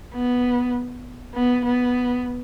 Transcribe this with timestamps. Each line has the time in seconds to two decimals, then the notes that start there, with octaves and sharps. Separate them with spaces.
0.14 B3
1.35 B3
1.65 B3